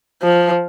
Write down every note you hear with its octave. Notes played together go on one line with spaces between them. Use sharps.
F3